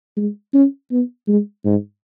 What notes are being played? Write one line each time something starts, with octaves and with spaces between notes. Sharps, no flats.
G#3
C#4
B3
G#3
G#2